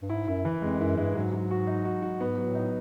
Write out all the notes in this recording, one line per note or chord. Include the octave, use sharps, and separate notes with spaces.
G2
G#2 E4
F#2 E4
E3
F2 G#3
F#2 E4
G2 G#3
G#2 F#3
F#3
F#4
D#4
F#4
F#4
G#2 B3
F#3
A2
D#4